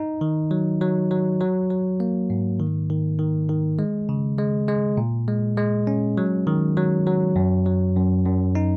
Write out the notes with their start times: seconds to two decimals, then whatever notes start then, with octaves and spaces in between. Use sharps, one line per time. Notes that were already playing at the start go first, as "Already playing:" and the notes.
Already playing: D#4
0.21 D#3
0.51 F#3
0.81 F#3
1.11 F#3
1.41 F#3
1.70 F#3
2.00 A#3
2.30 G#2
2.60 D#3
2.90 D#3
3.19 D#3
3.49 D#3
3.79 G#3
4.09 C#3
4.38 G#3
4.68 G#3
4.97 A#2
5.28 G#3
5.57 G#3
5.87 C#4
6.17 F#3
6.47 D#3
6.77 F#3
7.07 F#3
7.36 F#2
7.66 F#3
7.96 F#2
8.26 F#2
8.55 D#4